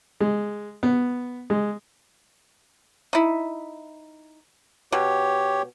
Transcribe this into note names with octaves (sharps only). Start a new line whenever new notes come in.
G#3
B3
G#3
D#4 E4
B2 G4 C#5